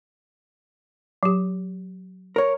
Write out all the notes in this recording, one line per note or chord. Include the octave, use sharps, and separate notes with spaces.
F#3 G4
A#4 C#5